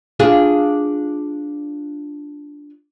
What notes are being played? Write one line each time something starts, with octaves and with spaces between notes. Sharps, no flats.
D4 F4 G#4